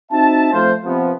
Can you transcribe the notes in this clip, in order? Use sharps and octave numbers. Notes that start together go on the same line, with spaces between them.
C4 D#4 F#4 E5 A5
F3 A3 C4 F4 C5
C3 F3 B3